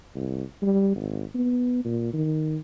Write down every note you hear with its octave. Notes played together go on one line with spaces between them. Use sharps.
C2
G3
G#1
B3
A#2
D#3